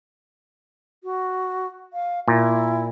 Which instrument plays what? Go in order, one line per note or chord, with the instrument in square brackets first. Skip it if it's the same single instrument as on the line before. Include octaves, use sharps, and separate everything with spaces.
[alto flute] F#4
F5
[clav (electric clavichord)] A#2 [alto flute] E4